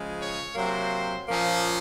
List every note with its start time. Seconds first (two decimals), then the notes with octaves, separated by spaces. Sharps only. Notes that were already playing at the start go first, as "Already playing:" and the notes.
Already playing: C#3 F3 G#3
0.19 C#5
0.55 C3 F#3 A#3 C5
1.29 A#2 F3 A#3 C#4